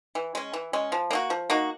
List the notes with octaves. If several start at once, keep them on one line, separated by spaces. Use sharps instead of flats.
E3
G#3 C#4
E3
G#3 C#4
F3
A#3 D#4 F#4
F3
A#3 D#4 F#4